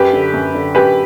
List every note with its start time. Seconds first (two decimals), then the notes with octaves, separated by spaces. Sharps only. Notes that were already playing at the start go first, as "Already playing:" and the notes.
Already playing: F#2 G4 B4
0.13 D3
0.33 F#2
0.55 D3
0.75 F#2 G4 B4